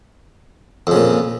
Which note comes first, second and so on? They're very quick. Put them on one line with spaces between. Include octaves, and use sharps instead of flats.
F2 C#3 A#2